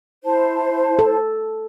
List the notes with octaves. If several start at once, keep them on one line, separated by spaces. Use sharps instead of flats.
E4 C5 A5
A4